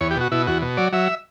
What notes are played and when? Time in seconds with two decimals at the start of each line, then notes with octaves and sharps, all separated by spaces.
0.01 E2 C#5
0.11 G4
0.17 B2 F#4
0.32 B2 E4
0.47 E2 F#4
0.62 B2
0.77 F#3 D5
0.93 F#3 E5